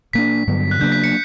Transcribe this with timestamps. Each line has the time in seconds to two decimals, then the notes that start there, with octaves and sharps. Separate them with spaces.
0.13 B2 A#3 D4 B6
0.47 G2 D3 F#3 B3
0.71 F#6
0.81 C#3 F#3 A#3 D4 G6
0.92 B6
1.04 C#7